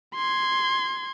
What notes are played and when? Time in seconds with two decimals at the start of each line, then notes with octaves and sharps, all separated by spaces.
0.15 C6 G#6